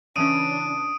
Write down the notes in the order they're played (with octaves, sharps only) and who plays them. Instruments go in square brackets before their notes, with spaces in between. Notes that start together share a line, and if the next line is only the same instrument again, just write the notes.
[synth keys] C#3 E3 C#4 [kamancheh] D4 [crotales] D#6 D7 D#7